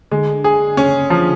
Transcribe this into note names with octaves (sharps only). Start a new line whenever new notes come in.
D3 G#3
G#4
C#3 C#4
C#3
D3 F3